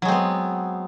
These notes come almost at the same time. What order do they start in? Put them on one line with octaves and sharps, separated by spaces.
F#3 G#3 C4 B3